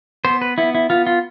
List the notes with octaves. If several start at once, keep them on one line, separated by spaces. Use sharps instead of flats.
B3 C5
B4
B3 E4
E4
B3 F4
F4